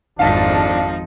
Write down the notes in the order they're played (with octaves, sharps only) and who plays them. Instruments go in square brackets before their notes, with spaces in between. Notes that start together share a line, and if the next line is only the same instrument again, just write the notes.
[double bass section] G#1 F2 [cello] F3 D#4 [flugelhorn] D4 [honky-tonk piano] F5 A5